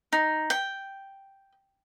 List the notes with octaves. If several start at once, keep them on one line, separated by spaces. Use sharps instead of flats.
D#4
G5